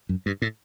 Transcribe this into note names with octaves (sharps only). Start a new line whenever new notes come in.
F#2
G2
A2